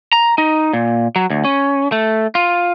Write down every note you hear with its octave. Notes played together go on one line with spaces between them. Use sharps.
A#5
D#4
A#2
F#3
D2
C#4
A3
F4